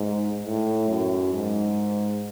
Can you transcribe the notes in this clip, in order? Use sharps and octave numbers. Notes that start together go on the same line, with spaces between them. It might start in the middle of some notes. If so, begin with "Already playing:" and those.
Already playing: G#2
A2
F#2
G#2